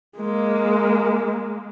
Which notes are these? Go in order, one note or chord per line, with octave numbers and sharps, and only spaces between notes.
G#3 A#3